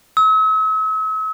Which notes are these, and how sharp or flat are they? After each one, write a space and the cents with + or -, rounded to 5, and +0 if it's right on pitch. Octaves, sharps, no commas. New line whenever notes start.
E6 -45